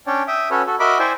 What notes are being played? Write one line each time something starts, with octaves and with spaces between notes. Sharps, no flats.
C#4 D4 C#5 D5 G5
E5 G5 D#6
C#4 F#4 A4 B4 C#5
F#4 A4
F#4 A#4 D#5 E5 B5 D6
E4 C5 D5 E5 G5 G#5